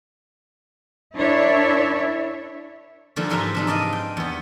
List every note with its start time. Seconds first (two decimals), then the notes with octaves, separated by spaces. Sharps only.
1.16 D4 E4 A#4 C#5 D5 E5
3.16 D3 E3 F3 G3 A#3
3.30 G#2 E3 F3 F4 E5 A#5
3.55 C3 D4 D#4
3.67 D4 D5 D#5 F5
3.93 G5
4.17 E2 B3